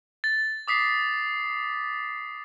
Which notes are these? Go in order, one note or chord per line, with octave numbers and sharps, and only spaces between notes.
A6
D6 D#6 B6 C7